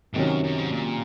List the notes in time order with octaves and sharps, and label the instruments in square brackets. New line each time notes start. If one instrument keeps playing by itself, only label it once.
[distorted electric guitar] G#2 [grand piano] C3 D#3 F#3 C#4
[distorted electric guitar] F#2
F#2
G#2
A#2